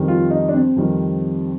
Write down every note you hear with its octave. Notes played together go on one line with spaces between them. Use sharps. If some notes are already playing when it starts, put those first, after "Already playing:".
Already playing: F2 D#3 G3
F4
D#4
D4
C4
F2 D#3 G3